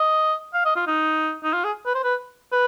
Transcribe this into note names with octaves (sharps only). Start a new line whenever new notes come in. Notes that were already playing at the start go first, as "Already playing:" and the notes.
Already playing: D#5
F5
D#5
F4
D#4
D#4
F4
G#4
B4
C5
B4
B4